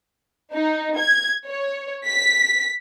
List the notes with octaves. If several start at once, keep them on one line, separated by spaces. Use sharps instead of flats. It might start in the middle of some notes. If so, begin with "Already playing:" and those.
D#4
G#6
C#5
B6